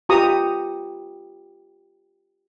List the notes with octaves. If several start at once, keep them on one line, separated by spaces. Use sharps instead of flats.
F4 G4 B4 A#5 C#6 D#6